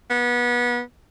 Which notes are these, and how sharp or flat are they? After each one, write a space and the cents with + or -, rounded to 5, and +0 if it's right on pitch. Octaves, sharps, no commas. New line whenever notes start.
B3 -25